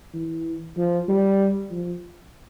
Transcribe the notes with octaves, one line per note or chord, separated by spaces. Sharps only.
E3
F3
G3
F3